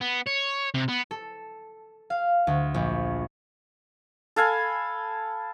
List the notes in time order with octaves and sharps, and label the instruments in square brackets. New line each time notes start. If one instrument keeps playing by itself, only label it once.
[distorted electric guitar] B3
C#5
C3
B3
[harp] A4
F5
D2
A#1
[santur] A4 F5 G#5 B5